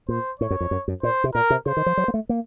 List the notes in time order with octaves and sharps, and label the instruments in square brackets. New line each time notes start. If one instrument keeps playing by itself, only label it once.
[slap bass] A#2 [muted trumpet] C5
[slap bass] A2 [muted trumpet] C#5
[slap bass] F#2
F2
F#2
F#2
[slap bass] A#2 [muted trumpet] C5
[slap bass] C3
[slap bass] A#2 [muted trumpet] A#4
[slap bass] C3
[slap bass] C#3 [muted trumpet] C5
[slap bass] D#3
F3
F#3
A#3
A3
A#3